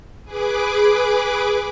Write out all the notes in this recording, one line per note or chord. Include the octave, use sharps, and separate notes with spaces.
G#4 B4 D6